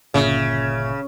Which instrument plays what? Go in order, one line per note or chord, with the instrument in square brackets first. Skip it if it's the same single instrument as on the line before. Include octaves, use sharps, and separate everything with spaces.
[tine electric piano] G1 A#2 E5 [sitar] C#3